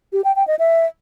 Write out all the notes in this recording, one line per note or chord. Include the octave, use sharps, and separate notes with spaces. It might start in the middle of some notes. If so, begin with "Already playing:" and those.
G4
G5
G5
D#5
E5